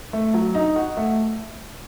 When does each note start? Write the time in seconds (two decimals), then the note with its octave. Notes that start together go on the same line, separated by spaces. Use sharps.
0.13 A3
0.34 F#3
0.55 D#4
0.76 F#4
0.97 A3